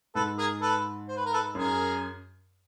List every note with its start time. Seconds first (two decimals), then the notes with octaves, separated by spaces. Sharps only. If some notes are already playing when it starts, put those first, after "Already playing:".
0.15 G#2 A4 B4
0.38 G#4 A#4
0.61 A4 B4
1.08 C5
1.17 B4
1.25 A#4
1.33 A4 B4
1.55 F#2 G#4 A#4